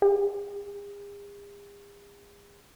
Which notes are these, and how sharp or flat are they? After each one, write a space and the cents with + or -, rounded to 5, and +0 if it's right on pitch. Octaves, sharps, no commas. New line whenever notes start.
G#4 -45